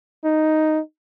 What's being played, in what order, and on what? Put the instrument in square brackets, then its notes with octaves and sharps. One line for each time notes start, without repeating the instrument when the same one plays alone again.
[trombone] D#4